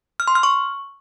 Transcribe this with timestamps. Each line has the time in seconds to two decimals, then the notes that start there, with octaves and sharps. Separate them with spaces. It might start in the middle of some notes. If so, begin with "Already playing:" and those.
0.20 F6
0.28 C6
0.35 F6
0.43 C#6